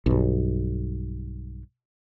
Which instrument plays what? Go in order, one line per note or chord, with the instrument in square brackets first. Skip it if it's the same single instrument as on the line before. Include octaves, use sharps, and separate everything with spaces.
[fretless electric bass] B1 G2